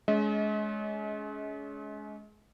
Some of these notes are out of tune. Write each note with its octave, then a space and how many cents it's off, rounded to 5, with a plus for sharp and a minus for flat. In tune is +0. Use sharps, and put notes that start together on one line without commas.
G#3 +25 C#4 +35 D#5 +40